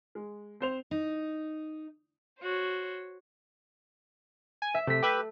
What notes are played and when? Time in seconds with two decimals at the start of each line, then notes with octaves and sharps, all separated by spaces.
0.15 G#3
0.60 C4 C5 F7
0.91 D#4
2.42 F#4 C5 C#5
4.62 G#5
4.75 E5
4.87 C3 A3 B6
5.02 G4 B4 E5